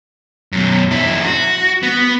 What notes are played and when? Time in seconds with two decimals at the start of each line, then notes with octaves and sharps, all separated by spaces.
0.52 F#2 B2
0.91 F2 E4
1.25 F#4
1.83 B3